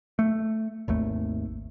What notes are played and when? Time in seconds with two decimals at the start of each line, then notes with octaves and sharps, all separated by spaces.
0.19 A3
0.88 G#1 D#2 A3